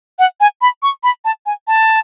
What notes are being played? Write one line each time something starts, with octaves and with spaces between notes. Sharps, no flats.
F#5
G#5
B5
C#6
B5
A5
G#5
A5